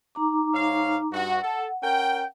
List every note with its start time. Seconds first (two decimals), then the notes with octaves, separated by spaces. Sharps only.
0.15 D#4 A#5 D6
0.54 G#2 C#5 F5
1.12 G2 F#4 F#5
1.42 A4
1.83 C#4 A#4 G5